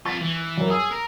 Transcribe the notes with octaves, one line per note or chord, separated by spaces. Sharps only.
F2 F4 C#6 A6 B6
E3
F#2 A#4
G#4 D#6 E6
A#4